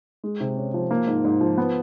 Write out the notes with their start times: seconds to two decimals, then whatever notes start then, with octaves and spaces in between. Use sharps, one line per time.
0.24 G#3
0.40 C3
0.56 C#4
0.74 F3
0.91 A#3
1.07 G#2
1.25 G#2
1.41 F3
1.58 B3